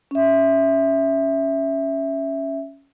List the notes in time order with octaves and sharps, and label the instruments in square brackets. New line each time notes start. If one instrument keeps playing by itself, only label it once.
[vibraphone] C#4 E5